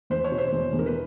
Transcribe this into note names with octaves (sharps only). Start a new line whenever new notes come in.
E2 C5
C#5
B2
C5
E2
E2
A#4
B4